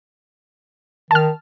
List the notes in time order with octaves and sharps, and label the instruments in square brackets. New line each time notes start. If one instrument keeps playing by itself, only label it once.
[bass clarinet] D#3 [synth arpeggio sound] A5 F6